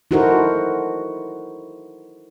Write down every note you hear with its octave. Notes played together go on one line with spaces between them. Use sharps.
D#4 E4 F#4 A4 A#4 C5